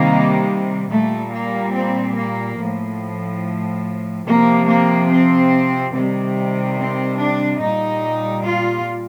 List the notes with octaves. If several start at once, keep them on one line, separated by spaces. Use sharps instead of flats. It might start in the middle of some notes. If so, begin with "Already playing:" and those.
Already playing: C3 D#3 G3 A#3
A#2 G3 A3
A#3
C4
A#3
A2 F3
C3 F3 A#3
A#3
C4
C3 D#3 G3
C4
D4
A#2 G3 D#4
F4